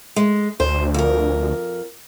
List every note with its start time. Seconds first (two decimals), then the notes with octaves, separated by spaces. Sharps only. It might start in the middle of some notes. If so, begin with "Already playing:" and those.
0.16 G#3
0.60 D2 C5
0.94 F2 A#4